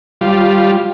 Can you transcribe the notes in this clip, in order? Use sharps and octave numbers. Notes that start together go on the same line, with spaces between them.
G3 F4